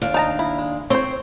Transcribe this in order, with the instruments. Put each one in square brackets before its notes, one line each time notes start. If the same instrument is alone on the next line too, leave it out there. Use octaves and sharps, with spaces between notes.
[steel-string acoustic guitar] D#2 D4 F5
[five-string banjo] D#4 A5 A#5
E4
G#3
[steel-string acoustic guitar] C4 [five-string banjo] C5 C#5